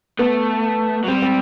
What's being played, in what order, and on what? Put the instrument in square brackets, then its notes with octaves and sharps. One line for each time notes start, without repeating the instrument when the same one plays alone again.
[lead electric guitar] A3 [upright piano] B3
[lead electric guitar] F#3
[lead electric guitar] G3 [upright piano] C4
[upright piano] C4